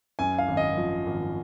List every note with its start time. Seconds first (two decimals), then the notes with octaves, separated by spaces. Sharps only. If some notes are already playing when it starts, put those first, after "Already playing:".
0.19 F#2 G#5
0.38 F5
0.48 G#1
0.57 D#5
0.77 F3
1.06 G#1